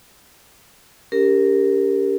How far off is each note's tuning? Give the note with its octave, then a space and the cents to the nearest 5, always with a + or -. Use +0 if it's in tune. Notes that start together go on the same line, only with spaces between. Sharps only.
C#4 +40 G4 +15 A#4 -5